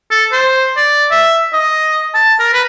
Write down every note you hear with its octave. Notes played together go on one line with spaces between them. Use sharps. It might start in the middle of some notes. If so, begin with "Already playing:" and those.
A4
C5
D5
E5
D#5
A5
A#4
B4